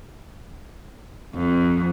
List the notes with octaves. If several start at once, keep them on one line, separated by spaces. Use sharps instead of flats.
F2